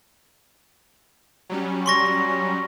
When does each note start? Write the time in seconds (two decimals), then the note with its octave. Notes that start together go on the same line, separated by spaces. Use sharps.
1.50 F#3 G3 C#4
1.86 C6 C#6 A#6